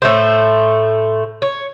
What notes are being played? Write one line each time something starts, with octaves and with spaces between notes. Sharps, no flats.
A2 A3 C5
C#5